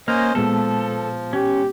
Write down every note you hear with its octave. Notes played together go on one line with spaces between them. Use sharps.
A#3 C#4 C5 D#5 F6
A#2 F3 G#3 B3 A4
C#4 G4